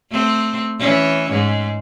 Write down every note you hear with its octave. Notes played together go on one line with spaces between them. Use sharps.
A3 C4
E3 C#4
G#2